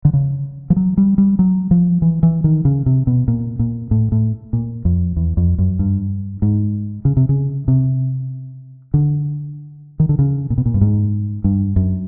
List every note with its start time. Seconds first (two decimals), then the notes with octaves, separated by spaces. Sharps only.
0.05 D3
0.13 C#3
0.70 F3
0.76 F#3
0.98 G3
1.18 G3
1.39 F#3
1.71 F3
2.02 E3
2.23 E3
2.44 D#3
2.65 C#3
2.86 C3
3.07 B2
3.28 A#2
3.59 A#2
3.91 A2
4.12 A2
4.53 A#2
4.85 F2
5.17 E2
5.37 F2
5.59 F#2
5.79 G2
6.42 G#2
7.05 C#3
7.17 C3
7.29 C#3
7.68 C3
8.94 D3
10.00 D#3
10.09 D3
10.19 C#3
10.50 A#2
10.58 B2
10.66 A#2
10.74 G2
10.81 G#2
11.44 G2
11.76 F#2